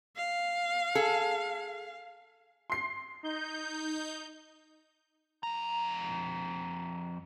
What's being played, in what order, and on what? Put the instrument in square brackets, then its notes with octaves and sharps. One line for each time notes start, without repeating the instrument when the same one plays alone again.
[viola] F5
[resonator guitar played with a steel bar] G#4 A4
[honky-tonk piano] C6 C7
[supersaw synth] D#4 G6
[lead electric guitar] F2 A#5